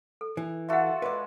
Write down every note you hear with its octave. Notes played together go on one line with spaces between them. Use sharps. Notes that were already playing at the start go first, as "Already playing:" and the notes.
A4
E3
F4 F#4 A4 E5 F#5
G#3 B4 D5